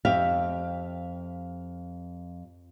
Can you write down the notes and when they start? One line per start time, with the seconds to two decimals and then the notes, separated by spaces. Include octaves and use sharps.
0.05 F2 G4 E5 F5